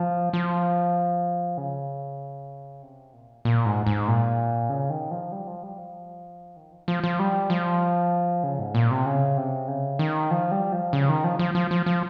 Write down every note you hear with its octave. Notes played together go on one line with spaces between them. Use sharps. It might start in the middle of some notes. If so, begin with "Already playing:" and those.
Already playing: F3
F3
C#3
C3
A#2
A#2
G#2
G#2
A#2
C#3
D#3
F3
G3
F3
G3
F3
D#3
F3
F3
F3
G3
F3
C#3
G#2
A#2
C3
C#3
C3
C#3
D#3
F3
G3
F3
C#3
D#3
F3
F3
F3
F3
F3